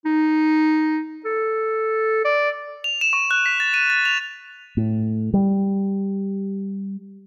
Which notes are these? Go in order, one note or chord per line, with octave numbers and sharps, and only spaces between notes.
D#4
A4
D5
F7
E7
C#6
F#6
B6
A6
D#7
A6
F7
A2
G3